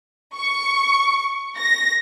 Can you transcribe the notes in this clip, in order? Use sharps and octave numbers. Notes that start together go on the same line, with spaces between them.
C#6
A#6